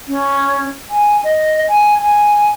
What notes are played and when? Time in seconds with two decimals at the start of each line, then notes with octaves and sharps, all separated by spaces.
0.08 C#4
0.90 G#5
1.24 D#5
1.69 G#5
2.02 G#5